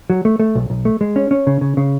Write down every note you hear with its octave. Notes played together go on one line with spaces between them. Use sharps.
F#3
A3
A3
B1
B1
A3
G#3
C#4
C#4
C#3
C#3
C#3